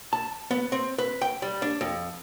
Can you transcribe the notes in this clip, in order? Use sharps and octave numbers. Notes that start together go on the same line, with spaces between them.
A5
B3
C4
B4
G5
G3
D4
F2